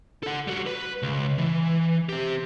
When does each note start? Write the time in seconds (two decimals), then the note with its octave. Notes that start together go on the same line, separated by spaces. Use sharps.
0.23 A4 F#5
0.47 G3 F#4
0.66 B4
1.02 C#2
1.38 E3
2.09 C4 G4